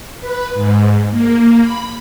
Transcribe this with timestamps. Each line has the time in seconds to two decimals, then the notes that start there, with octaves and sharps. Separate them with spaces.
0.21 B4
0.54 G#2
1.11 A#3
1.61 B5